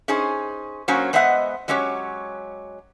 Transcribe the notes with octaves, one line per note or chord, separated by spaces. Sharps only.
C#4 D#4 G#4 C5
F#3 A#3 C#4 C5
G#3 B3 C5 D#5 E5 F#5
F#3 G#3 C#4 G4 C#5